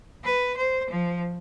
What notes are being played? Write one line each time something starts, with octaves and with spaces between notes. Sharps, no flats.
B4
C5
F3